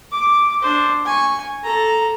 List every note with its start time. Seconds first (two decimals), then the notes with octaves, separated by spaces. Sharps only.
0.11 D6
0.62 D4 C5
1.05 G#5 C#6
1.63 A4 A#5